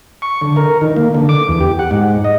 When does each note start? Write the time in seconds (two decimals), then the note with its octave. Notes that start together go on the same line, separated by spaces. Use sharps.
0.22 C#6
0.42 D3
0.56 A#4
0.81 D#3
0.96 A#3
1.14 D3
1.29 D6
1.48 E2
1.60 G4
1.79 F#5
1.91 G#2
2.24 D#5